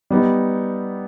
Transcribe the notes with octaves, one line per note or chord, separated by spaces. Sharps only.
G3 B3 D#4